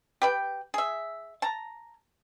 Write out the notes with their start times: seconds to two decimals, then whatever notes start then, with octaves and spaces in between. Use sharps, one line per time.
0.22 G4 B4 G5
0.74 G#4 E5
1.42 A5 A#5